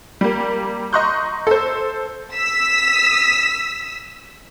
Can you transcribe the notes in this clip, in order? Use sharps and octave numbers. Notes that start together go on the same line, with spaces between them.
G3 A#3
D#5 A#5 C6 C#6 F#6 G6
A4 C5
E6 B6